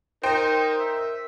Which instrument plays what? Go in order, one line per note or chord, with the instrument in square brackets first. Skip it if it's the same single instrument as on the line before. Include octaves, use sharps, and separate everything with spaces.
[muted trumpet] D#4 [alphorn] A#4 [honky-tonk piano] C5 G5
[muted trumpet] E5